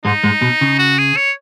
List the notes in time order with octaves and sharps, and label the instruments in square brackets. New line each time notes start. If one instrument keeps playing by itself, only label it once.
[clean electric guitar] G#2 G#3 [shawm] D#4
[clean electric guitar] G#2 G#3
B2
C#3
[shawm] F#4
G#4
C#5